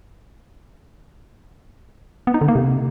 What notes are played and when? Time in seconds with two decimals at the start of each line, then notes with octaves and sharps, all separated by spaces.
2.27 B3
2.34 D#4
2.41 D3
2.48 A#3
2.55 C3